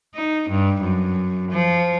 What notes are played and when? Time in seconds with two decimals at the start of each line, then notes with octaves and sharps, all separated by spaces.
0.14 D#4
0.49 G2
0.82 F#2
1.51 F3